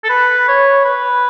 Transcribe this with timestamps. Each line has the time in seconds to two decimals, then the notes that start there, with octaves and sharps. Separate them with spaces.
0.04 A4
0.09 B4
0.48 C#5
0.85 B4